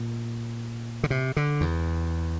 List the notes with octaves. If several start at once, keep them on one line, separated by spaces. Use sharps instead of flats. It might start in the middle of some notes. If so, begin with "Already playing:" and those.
Already playing: A#2
D3
C3
D3
E2